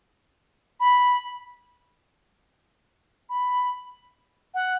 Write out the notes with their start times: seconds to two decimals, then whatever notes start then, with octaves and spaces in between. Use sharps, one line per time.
0.80 B5
3.29 B5
4.54 F#5